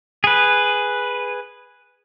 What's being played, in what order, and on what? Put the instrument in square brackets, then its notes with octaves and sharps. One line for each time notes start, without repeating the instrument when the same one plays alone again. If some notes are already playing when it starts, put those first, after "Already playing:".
[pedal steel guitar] G#4 B4